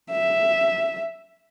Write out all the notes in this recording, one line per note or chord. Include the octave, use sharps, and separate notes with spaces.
E5